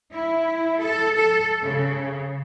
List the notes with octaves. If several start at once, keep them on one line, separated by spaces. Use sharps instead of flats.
E4
A4
A4
C#3